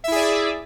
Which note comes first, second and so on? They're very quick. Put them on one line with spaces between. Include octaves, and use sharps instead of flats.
E5 E4 G#4 D5